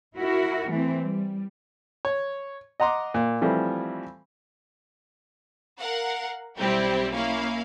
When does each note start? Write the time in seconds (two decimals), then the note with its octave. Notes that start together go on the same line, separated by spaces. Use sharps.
0.17 E4 F#4 A#4
0.70 E3 A3 C4
1.02 G3
2.05 C#5
2.80 D#5 F#5 A#5 C6 D6
3.14 A#2
3.41 E3 F3 G3 A3 C4
5.79 A#4 F5 F#5
6.58 B1 G3 C4 E4 G4
7.13 A#3 C#4 E4 F5